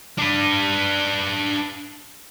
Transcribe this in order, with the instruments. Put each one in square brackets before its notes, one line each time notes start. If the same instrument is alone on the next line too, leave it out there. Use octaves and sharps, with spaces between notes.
[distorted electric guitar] D4 B4